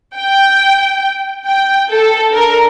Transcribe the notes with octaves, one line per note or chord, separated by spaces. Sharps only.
G5
G5
A4
D4 A4 A#4